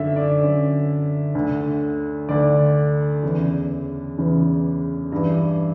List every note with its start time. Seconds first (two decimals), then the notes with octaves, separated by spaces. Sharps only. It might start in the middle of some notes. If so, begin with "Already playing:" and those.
Already playing: F#2 D3 E5
0.16 D5
0.41 F#2 D3
1.35 D2 D3
2.29 D2 D3 D5
3.23 E2 C#3 E3
4.18 E2 C#3 E3
5.12 G2 E3